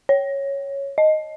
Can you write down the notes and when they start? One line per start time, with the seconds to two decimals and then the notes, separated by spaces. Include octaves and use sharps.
0.09 C#5
0.98 D#5